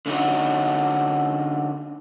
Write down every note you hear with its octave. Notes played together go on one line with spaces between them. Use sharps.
D3 C#4 D#4 F#4